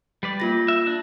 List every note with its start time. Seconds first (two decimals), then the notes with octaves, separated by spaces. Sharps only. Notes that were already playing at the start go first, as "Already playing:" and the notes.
0.23 G3 B4 D5
0.40 A#3 F4 A#6
0.68 E5
0.87 D4